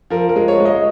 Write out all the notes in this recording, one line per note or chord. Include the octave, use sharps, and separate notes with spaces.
F3 A#4
A#4
G#3
C#5
G#3
D#5